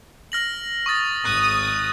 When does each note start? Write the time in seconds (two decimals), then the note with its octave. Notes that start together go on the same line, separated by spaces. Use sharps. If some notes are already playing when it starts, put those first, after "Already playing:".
0.32 F6 A#6 F#7
0.86 C#6 D#6 A6
1.25 G#1 D#6 F#6